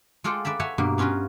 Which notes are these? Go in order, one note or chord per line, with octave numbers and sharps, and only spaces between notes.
G#3 F4 A4 D5 F#5 G5
B4 D5 E5 A5 B5
C#5 E5 F#5 G#5 A5
G2 B2 A#3
B3 C#4 F4 A#4 B4